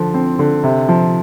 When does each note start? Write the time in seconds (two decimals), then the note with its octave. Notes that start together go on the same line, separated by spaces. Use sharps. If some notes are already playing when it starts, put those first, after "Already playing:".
Already playing: D3 F3
0.14 C4
0.39 D3
0.64 C3
0.89 F3